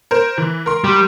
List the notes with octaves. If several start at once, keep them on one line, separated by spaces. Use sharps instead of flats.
A#4 C5
E3
A#4 C6
G3